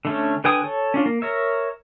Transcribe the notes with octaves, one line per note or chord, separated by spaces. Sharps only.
D3 A3 C#4
D3 B4 G5 G#5 D#6
A4 C#5
C#4 D4 F4
A#3
A#4 C#5 E5